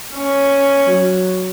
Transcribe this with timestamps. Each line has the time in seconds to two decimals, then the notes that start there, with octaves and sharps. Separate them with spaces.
0.14 C#4
0.87 F#3